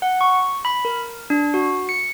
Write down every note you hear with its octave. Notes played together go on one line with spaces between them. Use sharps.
F#5
C#6
B5
A#4
D4
F#4
C#7